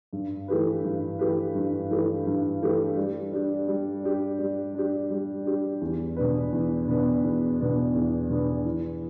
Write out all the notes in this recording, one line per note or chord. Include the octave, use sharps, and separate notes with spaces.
G2
E3 A3 G4 B4
G2
E3 A3 G4 B4
G2
E3 A3 G4 B4
G2
E3 A3 G4 B4
G3
D4 G4
G3
D4 G4
G3
D4 G4
G3
D4 G4
E2
B2 B3 D4 B4
E2
B2 B3 D4 B4
E2
B2 B3 D4 B4
E2
B2 B3 D4 B4
E3